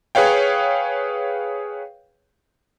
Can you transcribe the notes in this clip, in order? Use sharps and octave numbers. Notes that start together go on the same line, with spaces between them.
G#4 B4 C#5 F5 G5